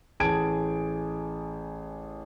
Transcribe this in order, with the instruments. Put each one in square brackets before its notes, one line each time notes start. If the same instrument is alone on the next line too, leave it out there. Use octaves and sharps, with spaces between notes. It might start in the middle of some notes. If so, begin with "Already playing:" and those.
[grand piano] A1 G#4 A5 G#6 D7